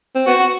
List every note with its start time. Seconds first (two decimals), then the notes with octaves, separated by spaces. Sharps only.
0.15 C4
0.27 B3 F#4